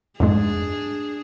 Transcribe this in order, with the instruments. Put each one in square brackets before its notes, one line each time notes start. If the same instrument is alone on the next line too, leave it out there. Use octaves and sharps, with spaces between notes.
[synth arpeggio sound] F2 G#2 G#3 [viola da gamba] D4 G#4